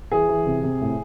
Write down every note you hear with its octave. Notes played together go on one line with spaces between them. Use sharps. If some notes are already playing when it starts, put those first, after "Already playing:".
E3 G#4
E3
C3
C3
A2